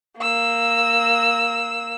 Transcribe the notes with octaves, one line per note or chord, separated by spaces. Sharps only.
A#3 E6